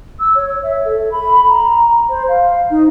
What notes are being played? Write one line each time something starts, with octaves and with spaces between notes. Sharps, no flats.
E6
C#5
E5
A4
B5
A#5
C5
F5
D#4